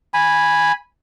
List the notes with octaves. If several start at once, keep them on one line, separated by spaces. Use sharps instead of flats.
G#5 B5